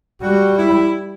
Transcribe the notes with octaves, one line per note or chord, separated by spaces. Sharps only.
G3 F#4
E4